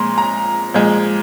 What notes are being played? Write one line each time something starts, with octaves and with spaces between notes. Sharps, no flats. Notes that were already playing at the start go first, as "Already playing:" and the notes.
Already playing: A#2 F3 G#3 A#5 C6
A#5
A#2 F3 G#3